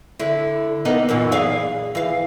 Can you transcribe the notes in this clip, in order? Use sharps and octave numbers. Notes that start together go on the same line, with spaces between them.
D3 E4
A#3 B3 D#4
F#2 A#2 E3
G#4 D5 F5
E3 F5